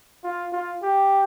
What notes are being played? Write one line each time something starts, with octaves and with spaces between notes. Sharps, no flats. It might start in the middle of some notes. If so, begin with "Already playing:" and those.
F4
F4
G4